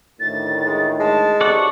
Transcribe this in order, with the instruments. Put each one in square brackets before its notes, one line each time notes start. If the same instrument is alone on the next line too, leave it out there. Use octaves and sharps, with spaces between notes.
[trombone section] D2 A2 D#3 [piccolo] A6
[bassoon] G#3
[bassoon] G#3 [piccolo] A5
[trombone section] B1 F#2 C3 [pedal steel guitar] A4 D5 F#5 [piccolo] C#6